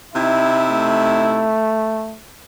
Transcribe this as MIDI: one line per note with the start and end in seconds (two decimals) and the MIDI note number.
0.14 1.58 48
0.14 1.58 63
0.14 1.58 64
0.14 0.61 76
0.69 2.18 57